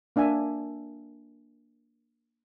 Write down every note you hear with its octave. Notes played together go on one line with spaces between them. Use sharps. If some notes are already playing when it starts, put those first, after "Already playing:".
A#3 D4 E5 G#5